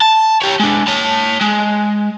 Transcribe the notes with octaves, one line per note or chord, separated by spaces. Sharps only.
A5
G4 C#5
G#3 D4
C#5 A5
G#3